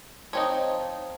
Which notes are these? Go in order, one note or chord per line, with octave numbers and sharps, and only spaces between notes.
F3 C4 D#4 C#5